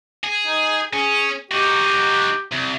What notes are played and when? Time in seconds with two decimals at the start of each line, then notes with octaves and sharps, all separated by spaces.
0.24 G#4
0.47 D#4
0.93 C#4 G#4
1.51 D#4 F#4 G4
2.52 C2